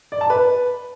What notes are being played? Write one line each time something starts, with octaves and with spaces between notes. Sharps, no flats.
D5
A5
B4